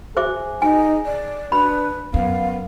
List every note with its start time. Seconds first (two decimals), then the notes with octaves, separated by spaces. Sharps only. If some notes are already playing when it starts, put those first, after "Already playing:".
0.17 G#4 C5 E5 D6
0.62 D#4 G#5
1.05 D5
1.52 D4 B4 B5
2.14 F#2 B3 F5